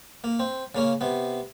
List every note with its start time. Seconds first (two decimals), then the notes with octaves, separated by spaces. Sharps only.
0.24 A#3
0.40 C4
0.75 C#3 A#3 C#4
1.01 C3 B3